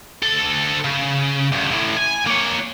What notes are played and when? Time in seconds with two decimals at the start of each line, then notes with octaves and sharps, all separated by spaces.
0.23 D2 A4
0.85 C#3
1.53 D2 G2
1.72 A2 E3
1.97 G#5
2.27 A#3 C#5